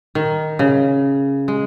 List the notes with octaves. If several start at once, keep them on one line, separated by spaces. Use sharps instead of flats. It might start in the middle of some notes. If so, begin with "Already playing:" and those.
D#3
C#3
G#3